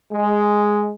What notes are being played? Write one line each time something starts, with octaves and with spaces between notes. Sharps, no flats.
G#3